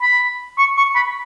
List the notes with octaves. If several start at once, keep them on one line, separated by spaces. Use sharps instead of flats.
B5
C#6
C#6
B5